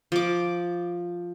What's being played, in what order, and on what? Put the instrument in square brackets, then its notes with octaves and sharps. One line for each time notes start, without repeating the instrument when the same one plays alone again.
[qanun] F3 D6